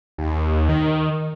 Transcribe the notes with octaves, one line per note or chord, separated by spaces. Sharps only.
D#2
D#3